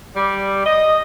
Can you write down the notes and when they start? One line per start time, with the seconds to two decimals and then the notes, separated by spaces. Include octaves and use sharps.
0.14 G3
0.64 D#5